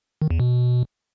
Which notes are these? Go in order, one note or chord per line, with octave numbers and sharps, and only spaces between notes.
D#3
E2
B2